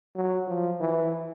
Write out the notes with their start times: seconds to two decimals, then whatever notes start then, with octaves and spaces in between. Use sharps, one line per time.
0.15 F#3
0.47 F3
0.80 E3